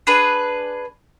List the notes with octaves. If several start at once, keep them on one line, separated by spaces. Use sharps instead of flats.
D4 G#4 B4